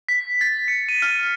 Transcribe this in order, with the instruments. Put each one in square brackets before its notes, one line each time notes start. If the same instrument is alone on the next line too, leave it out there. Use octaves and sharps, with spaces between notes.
[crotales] B6
A6
C#7
D#7
F6